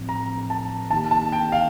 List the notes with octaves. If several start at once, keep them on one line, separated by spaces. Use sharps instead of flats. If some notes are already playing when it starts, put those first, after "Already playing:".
Already playing: A2 F3 C4
A#5
A5
D#3 A#3 D#4 G4 A5
A5
G5
F5